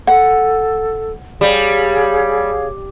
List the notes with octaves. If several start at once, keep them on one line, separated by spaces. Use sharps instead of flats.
A4 F#5
G3 G#4 C#5 F5